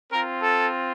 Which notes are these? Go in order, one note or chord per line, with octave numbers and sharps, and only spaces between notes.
C4 F4 A#4
A4